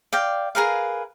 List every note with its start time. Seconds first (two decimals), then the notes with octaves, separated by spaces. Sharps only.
0.13 D5 F5 G5
0.55 G#4 A#4 B4 F5